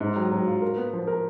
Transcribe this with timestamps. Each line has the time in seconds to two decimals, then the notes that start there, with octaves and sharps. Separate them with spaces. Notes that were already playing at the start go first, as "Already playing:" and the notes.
0.01 G#2
0.16 F#3
0.32 F#3
0.47 F4
0.62 A#4
0.77 B3
0.93 F3
1.07 A#4